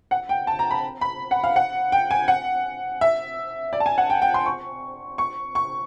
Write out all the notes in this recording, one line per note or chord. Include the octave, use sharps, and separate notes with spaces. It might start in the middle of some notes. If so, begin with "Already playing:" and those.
F#5
G5
A5
A#5
B5
B5
F#5
F5
F#5
G5
G#5
F#5
E5
D5
A5
G#5
F#5
G5
G5
C6
C#6
C#6
C#6